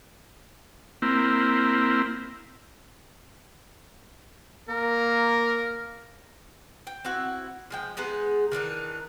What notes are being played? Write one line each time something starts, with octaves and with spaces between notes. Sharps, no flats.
A#3 C4 E4
A#3 A#4
G5
C4 E4 F#4
F3 G#3 G5
G#3 B3 D#4 G#4
D#3 E3 D4 D#4